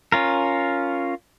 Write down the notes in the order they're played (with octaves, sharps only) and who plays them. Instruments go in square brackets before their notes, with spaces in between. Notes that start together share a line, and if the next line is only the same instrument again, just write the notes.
[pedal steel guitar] C#4 F4 A#4